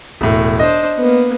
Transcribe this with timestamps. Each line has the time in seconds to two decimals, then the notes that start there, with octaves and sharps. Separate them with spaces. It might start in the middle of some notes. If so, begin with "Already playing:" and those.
0.21 E1 A2
0.59 D4 C5 D#5
0.97 A#3 B3